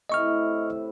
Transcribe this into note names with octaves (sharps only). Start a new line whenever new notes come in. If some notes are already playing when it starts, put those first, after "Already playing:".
A2 C3 E4 D#5 C#6 F6